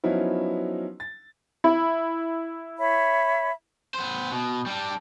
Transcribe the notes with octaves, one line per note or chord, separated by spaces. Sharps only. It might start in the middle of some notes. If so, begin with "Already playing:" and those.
F3 F#3 B3 C#4 D#4 E4
A6
E4
C#5 E5 B5
B3 C5
B2
G3 D4